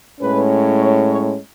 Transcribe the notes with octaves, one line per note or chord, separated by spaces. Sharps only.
A2 G#3 C#4 B4
C#5
C#5